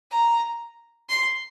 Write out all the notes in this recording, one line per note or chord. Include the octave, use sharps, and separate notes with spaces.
A#5
C6